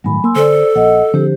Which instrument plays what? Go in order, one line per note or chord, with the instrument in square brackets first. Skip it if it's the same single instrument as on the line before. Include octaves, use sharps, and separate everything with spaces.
[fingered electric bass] G1 A2 D#3 [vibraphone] F#3 G#5 B5
[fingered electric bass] A#3 [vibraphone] G#5 C6 E6
[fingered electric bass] D3 [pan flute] A4 [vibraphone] C5 D5
[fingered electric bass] A#1 [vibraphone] D#5 F#5
[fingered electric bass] D3 F3 C4 [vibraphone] G4 C5